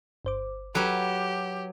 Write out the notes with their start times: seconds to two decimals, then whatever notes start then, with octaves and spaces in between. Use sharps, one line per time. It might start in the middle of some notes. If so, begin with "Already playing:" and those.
0.25 G1 C5 D6
0.75 F#3 G4 A4 B4